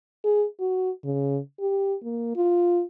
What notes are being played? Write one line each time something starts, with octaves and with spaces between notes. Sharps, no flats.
G#4
F#4
C#3
G4
A#3
F4